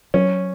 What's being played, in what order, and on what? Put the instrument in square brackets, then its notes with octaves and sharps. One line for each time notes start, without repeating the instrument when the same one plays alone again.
[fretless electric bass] F#3 [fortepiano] C#4